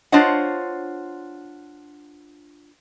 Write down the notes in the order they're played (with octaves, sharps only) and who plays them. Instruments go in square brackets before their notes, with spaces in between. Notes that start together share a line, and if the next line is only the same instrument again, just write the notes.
[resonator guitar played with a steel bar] D4 F4 C5 C#5 D#5 F#5